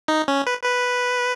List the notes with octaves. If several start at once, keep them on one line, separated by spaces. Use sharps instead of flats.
D#4
C#4
B4
B4